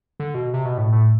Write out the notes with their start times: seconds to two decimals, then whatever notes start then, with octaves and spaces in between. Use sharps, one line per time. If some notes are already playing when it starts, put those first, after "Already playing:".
0.20 D3
0.34 B2
0.54 C3
0.65 B2
0.78 A2
0.92 A2